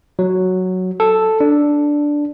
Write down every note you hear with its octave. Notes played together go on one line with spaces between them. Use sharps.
F#3
A4
D4